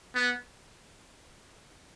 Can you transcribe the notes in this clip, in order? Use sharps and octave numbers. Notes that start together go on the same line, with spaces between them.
B3